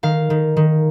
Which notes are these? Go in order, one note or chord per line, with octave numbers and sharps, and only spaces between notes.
D#3 F5
D#3
D#3